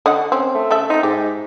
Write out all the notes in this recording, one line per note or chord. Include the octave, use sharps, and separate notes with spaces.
D3 D#5 F#5
C4 C#4
A3
C#3 A4 E5
A3 C4 D#4
G#2 G4